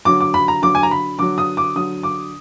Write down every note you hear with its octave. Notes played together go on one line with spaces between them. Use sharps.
D3 F#3 D6
D6
B5
A#5
D3 F#3 D6
G#5
A#5
B5
D3 F#3 D6
D#6
D6
D3 F#3 D#6
D6